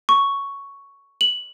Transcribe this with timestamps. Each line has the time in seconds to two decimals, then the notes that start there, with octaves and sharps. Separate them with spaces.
0.09 C#6
1.21 F#7